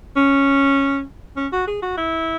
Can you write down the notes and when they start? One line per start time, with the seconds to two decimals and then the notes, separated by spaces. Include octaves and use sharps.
0.16 C#4
1.37 C#4
1.52 F#4
1.67 G#4
1.82 F#4
1.98 E4